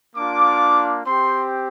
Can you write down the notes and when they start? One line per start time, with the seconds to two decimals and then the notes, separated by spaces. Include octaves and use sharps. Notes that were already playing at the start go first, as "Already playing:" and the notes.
0.16 A#3 D4 F4 D6
1.06 C4 G4 C6